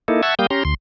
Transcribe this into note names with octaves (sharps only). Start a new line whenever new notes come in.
A#3 D#4 E4 A4
E5 F#5 A5 C#6 E6 G#6
G3 A#3 F5 G5 D#6 G6
C#4 G4 A#5 C6
D2 C6